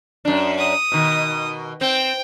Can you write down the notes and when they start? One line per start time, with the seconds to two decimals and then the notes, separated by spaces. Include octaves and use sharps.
0.25 F#2 D4
0.59 D#6
0.92 B2 D#3
1.81 C4 G5